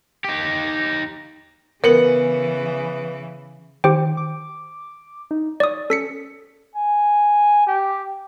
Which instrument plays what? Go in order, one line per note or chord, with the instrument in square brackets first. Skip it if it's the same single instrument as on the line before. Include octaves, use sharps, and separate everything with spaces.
[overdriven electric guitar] D#4 G4
[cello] C#3 E3 [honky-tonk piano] B3 C#7 F#7 [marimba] A#4
[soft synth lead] D#3 [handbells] G4 C5 G5
[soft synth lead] D6
D#4
[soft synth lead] C#5 [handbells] D5 D#6
[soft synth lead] C#4 [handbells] A4 B6 C#7
[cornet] G#5
G4